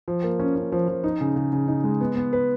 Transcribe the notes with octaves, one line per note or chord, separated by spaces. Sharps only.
F3
A#3
C#4
C#4
F3
F3
D#4
C#3
C#3
C#3
D#4
G#3
B3
B3
B4